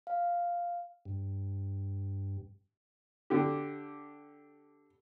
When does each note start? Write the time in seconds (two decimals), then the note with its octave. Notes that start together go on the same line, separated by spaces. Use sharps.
0.07 F5
1.05 G2
3.30 D3 G4